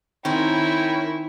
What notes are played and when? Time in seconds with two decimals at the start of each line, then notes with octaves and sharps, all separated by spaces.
0.25 D#3 C4 E4 A#4 C#5 G5 G#5